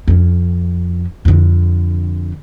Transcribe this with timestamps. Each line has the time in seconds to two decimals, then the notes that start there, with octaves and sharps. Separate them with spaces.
0.08 F2 C#4
1.25 F2 D3